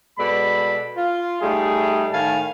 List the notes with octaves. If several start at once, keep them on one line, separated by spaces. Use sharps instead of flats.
B2 G#3 A4 D5 B5
F4
G3 A3 D#4 G#4
A2 D#3 F5 G#5 A5